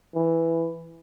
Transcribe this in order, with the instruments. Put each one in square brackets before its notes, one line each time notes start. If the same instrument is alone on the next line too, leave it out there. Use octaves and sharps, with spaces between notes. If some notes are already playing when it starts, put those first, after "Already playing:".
[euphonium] E3